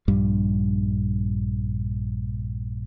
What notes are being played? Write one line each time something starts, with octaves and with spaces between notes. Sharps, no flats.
A#1 G2 G3